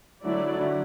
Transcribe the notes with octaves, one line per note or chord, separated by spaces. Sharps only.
D3 F#3 A3 E4 D5
D3